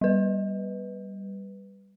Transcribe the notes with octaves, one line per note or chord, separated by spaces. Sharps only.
G3 B4